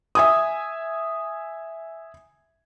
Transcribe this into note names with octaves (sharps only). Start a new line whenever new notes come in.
E5 G#5 D#6